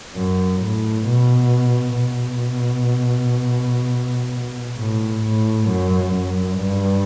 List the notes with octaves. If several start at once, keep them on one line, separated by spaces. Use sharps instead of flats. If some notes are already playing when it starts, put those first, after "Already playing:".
F#2
A2
B2
B2
A2
A2
F#2
F#2
G2